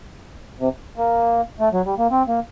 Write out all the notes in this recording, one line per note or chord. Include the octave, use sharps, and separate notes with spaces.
C3
A#3
A3
F#3
G3
A#3
C4
A#3